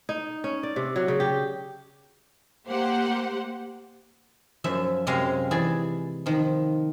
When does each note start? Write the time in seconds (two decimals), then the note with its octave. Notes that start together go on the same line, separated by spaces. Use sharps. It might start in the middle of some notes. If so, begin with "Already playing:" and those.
0.09 D#4
0.44 C#4
0.63 D5
0.76 C3
0.96 F#3
1.08 C#3
1.20 G4
2.67 A#3 G4 C5 F#5
4.64 F#2 F3 E5
5.07 F#2 C3 G#3 G4 F5 A#5
5.51 E3 G#4 D5
6.26 D#3 F3